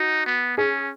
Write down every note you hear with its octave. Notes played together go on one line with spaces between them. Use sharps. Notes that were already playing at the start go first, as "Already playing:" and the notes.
Already playing: D#4 F#4
B3
C#4 G#4